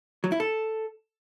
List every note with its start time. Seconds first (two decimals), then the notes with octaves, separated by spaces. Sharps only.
0.24 F#3
0.32 E4
0.40 A4